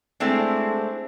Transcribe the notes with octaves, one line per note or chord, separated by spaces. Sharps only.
G#3 A3 C4 D4 E4